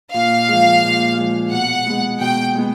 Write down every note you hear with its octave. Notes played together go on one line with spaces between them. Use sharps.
A#2 F5
F3 G#3
A#2
F3 G#3
B2 F#5
G#3 B3
B2 G5
G#3 B3